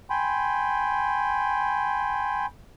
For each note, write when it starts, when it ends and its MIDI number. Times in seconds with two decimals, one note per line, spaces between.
0.10 2.46 79
0.10 2.46 80
0.10 2.46 83
0.10 2.46 84